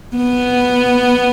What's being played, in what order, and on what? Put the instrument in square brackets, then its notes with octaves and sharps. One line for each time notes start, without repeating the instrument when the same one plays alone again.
[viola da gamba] B3